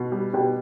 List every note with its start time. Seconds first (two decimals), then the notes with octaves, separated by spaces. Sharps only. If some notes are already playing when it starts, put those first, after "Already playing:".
Already playing: B2
0.12 G3
0.33 B2 G4 G5